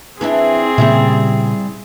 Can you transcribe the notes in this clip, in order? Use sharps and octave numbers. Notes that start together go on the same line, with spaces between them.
E3 C4 D4 E4 G#4
A#2 C#3 G3 A#3 C#4 E4